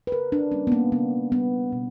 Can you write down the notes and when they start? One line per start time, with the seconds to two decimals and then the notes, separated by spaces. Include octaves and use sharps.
0.07 B4
0.12 C#3 A#4
0.32 D4
0.52 G3 A#3 C#4
0.67 B3
0.72 A#3
0.92 C#3 B3
1.32 G3 A#3 B3
1.72 B2